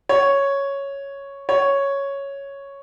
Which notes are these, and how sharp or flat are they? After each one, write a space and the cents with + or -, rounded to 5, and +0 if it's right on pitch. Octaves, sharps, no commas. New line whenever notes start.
C#5 +0
C#5 +0